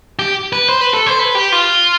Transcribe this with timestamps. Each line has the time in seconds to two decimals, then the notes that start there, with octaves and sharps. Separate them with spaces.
0.19 G4
0.53 B4
0.69 C5
0.81 B4
0.94 A4
1.06 C5
1.19 B4
1.35 G4
1.52 F4